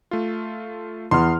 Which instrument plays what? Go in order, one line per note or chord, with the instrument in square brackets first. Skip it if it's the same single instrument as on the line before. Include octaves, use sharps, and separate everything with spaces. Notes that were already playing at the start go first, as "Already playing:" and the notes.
[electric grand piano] A3 F4
[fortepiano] E2 [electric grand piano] C6 F6